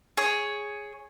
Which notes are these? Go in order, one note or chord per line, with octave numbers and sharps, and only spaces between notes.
G#4 C#5